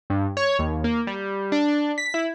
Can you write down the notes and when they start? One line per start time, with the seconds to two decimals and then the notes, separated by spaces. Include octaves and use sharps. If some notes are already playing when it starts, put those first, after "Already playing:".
0.10 G2
0.37 C#5
0.59 D#2
0.84 A#3
1.07 G3
1.52 D4
1.68 D4
1.98 B6
2.14 E4